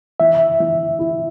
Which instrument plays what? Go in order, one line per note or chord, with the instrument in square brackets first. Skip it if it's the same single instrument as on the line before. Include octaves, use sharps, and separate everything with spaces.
[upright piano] E3 [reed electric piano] E5
[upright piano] E3
E4